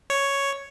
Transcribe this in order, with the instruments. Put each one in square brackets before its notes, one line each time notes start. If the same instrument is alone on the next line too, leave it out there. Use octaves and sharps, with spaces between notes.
[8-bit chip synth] C#5